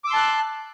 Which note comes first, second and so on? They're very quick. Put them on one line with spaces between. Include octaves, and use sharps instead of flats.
D6 E6 C6 A5 F#6